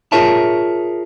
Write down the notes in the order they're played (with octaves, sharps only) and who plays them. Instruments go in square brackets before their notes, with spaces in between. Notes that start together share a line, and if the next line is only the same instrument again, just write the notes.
[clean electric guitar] F4 G#4 A#4 C#5 E5 A5